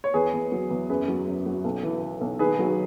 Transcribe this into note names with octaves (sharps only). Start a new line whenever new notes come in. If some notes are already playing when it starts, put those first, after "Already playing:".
C#5
E2 G#4 B4
E2
F#3
E2
F#2 G#4 B4
F#3
F#2
F#3
B1
E3
E3
B1
D#3 G#4 B4
F#3